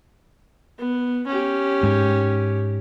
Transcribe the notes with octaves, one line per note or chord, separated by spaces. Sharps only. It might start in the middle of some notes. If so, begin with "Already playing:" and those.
B3
C#4 G4
G#2